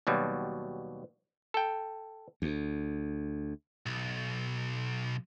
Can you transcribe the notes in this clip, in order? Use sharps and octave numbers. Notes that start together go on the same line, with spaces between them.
D#2 B2 F#3 G3
A4 G5
D2
B1